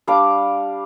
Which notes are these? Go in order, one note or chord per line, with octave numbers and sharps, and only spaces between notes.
G3 D4 F5 D6